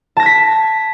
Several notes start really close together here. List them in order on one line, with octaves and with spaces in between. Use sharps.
A5 A#6 G#6 B6